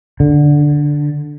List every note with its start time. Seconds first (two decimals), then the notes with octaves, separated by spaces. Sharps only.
0.20 D3